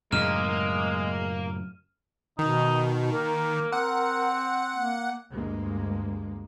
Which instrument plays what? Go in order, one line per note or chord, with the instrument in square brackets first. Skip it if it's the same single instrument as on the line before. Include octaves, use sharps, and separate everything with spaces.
[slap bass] F#2 A2 C#3 [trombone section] G#3 [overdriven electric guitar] A#3 [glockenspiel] F6 D#7 E7
[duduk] B2 [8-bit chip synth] D#3 [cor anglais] D#4
[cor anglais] A#3 [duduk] A#4
[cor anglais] C4 [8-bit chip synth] F#5
[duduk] A#3
[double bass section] D2 G2 G#3 A#3